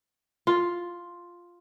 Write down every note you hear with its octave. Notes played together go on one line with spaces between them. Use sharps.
F4